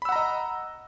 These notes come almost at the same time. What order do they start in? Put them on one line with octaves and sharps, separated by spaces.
B5 E6 F#5 A#5 D#5